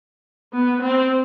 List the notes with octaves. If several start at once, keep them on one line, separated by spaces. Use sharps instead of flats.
B3
C4